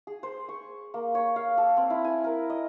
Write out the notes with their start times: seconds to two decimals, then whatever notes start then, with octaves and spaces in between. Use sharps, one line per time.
0.07 G#4
0.23 C5
0.49 C#6
0.94 A#3
1.15 C#5
1.36 F5
1.58 A4
1.77 C4
1.90 E4
2.04 G#5
2.24 A#4
2.50 D#5